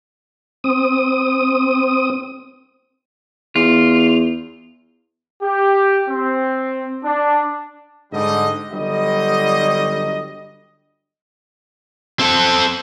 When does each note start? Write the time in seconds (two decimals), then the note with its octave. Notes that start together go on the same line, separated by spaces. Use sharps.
0.64 C4 D#6
3.56 E2 F4
5.43 G4
6.09 C4
7.05 D4
8.13 G#2 D3 G3 D#5
8.72 G1 D3 F#3 G3 D#5
12.19 C4 A4